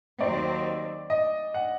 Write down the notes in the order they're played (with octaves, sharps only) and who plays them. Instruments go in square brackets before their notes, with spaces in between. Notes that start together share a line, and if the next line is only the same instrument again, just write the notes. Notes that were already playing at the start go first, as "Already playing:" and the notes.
[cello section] D#2 D#3 F#3 C4 [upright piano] D5
[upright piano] D#5
F#5